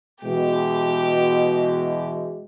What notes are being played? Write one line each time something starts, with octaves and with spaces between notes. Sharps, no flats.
B2 E3 G#3 G4